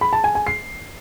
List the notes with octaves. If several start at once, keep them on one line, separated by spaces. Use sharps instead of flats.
B5
A5
G#5
G#5
C7